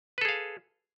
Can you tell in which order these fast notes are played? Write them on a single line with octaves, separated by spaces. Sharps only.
B4 A4 G#4 F5